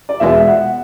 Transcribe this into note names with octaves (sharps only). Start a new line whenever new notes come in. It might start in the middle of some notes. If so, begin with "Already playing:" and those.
D5
E2 B2 G#3 E5
E5
F#5